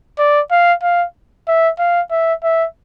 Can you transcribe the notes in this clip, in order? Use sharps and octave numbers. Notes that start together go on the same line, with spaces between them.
D5
F5
F5
E5
F5
E5
E5